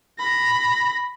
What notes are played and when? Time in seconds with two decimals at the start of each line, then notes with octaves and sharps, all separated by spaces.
0.19 B5 A#6